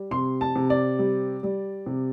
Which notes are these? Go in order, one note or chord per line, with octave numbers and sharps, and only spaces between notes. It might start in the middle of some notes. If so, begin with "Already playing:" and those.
Already playing: G3
C3 C6
A5
C3
D5
G3
G3
C3